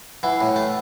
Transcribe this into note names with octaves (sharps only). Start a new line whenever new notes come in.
E3 F#5
A2
G5
A3